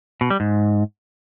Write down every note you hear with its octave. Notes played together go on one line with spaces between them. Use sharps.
B2
G3
G#2